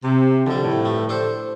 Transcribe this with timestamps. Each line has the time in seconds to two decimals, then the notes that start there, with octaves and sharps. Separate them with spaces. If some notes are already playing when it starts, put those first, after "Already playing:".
0.04 C3
0.47 F2 D3 G3
0.65 A2
0.85 G2 A3
1.09 D4 A4 C5